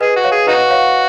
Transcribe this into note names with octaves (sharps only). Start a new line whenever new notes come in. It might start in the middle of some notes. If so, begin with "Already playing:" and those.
G#4 B4 D#5
F#4
C#5 F5
G#4
D#4 F#4 B4 D#5
C#5 F5